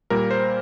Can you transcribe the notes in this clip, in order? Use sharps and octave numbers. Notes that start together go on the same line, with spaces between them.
A#2 G3 A#3 A#4
C5